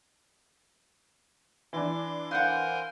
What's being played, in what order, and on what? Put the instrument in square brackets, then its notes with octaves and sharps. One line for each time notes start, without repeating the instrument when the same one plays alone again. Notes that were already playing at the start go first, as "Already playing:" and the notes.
[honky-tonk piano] E3 D4 [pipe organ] C6 D6
[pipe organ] A#4 G#5 C6 [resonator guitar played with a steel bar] C5 F#5 [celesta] F5 F#6 G6